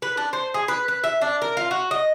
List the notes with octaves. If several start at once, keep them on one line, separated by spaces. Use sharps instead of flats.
B4
D4
C5
G#4
B4
B4
E5
D4
A#4
F4
F#4
D#5